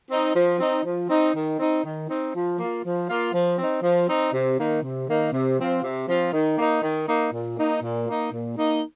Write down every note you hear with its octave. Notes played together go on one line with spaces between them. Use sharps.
C4 D#4
F3
C4 D#4
F3
C4 D#4
D#3
C4 D#4
D#3
C4 D#4
F3
A#3 F4
F3
A#3 F4
F3
C4 D#4
F3
C4 D#4
C3
D#3 A#3 D#4
C3
D#3 A#3 D#4
C3
F3 C4 F4
C3
F3 C4 F4
D#3
A#3 D#4
D#3
A#3 D#4
A#2
A#3 D#4
A#2
A#3 D#4
A#2
A#3 D#4